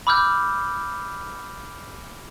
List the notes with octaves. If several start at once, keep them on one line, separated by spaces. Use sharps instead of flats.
B5 D6 E6 F6 G6